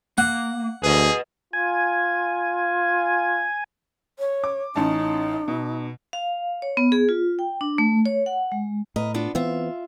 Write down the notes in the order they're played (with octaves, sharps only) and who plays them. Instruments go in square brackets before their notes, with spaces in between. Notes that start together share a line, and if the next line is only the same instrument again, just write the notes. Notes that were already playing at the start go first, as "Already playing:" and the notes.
[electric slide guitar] A#3 [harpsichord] F#5
[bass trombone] D2 [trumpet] G#4 [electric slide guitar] B4 D#5
[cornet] F4 [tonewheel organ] G#5
[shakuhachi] C#5
[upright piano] D6
[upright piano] A1 C#4 A5 [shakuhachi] D#4
[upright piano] B2
[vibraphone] F5
C#5
B3
G#4
F4
G5
D4
A3
C#5
F#5
G#3
[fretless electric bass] A2 [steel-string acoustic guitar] A#4 B4 D#5
[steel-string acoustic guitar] B3 D4 F4
[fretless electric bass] E3 B3 C4 [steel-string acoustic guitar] F4 E5